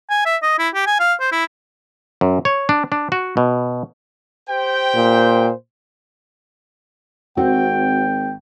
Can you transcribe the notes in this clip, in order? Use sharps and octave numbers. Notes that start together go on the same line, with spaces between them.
G#5
E5
D#5
E4
G4
G#5
F5
C5
E4
F#2
C#5
D4
D4
F#4
B2
G4 C5 G5
A#2
G#1 C4 F#4 G5